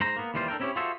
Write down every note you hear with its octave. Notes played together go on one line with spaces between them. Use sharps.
G#2 C5 A#5
A#3 B3
D#2 E3 G3 F4 C5
D4 A4 A#4 G5
C4 C#4 E4 F#4 G4 C#5
F4 F#4 G#4 A4 C5 E5